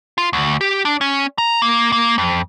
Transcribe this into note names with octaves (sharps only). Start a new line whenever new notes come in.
F4
D2
G4
D4
C#4
A#5
A#3
A#3
F2